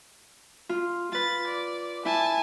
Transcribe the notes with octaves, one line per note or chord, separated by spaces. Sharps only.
F4
F4 B4 A6
D5
E4 G#5 A5